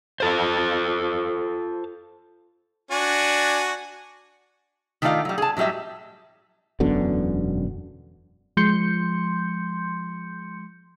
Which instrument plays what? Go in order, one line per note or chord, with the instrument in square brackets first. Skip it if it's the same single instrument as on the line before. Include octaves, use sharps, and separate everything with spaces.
[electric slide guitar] F4 A4 C5
[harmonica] D4 F#4 G#5
[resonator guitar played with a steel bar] D#3 A3 D#4 F4 D5 F5
F#3 G3
G#4 A5
A2 F#3 G3 D#5 E5
[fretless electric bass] E1 F#2 B2 D3
[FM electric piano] F3 G#3 C6 G6 C#7